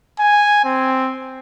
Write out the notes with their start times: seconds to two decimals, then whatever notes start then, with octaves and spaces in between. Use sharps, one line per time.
0.19 G#5
0.65 C4